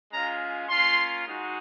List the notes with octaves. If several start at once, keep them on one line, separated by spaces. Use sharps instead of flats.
G#3 C#4 F4 A#5
A#3 C#4 F4 C6
G#3 D#4 F#4